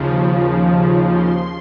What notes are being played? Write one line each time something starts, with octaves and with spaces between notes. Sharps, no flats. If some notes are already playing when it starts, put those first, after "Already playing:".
Already playing: D#2 C#3 F3
C6